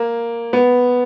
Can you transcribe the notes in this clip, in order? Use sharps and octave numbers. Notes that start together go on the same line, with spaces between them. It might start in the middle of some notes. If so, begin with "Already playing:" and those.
Already playing: A#3
B3